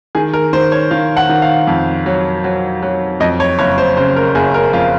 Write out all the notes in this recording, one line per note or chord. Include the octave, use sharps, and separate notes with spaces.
D#3 G#4
A#4
D#3 C5
C#5
D#3 F5
F#5
D#3
F5
F2
F#3
F#3
F#3
F2 D#5
C#5
F#1 C#5
C5
C#3 C5
A#4
F#1 G#4
A#4
F2 F4